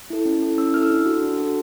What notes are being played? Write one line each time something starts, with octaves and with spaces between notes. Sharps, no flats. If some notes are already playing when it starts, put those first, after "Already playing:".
E4 A4
C#4
E4 A4
C#4 E6
E4 A4 F6
E6
D4
F#4 A4
D4
F#4 A4